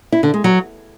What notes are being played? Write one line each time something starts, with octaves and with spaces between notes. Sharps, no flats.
E4
D3
G#3
F#3